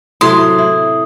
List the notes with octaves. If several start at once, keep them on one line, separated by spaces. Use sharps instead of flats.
A2 C3 F#3 C6 D#6
E4